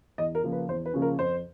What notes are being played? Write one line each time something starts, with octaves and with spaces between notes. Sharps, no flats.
E2 D#5
A#4
C#3 F3 A#3 C#4
B4
E2 C5
B4
C#3 F3 A#3 C#4
A#4
F2 C5